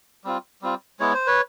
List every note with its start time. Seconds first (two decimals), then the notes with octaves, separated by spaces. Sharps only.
0.24 G3 C4 F4
0.62 G3 C4 F4
1.00 G#3 B3 E4 C#5
1.14 C5
1.27 B4 C#5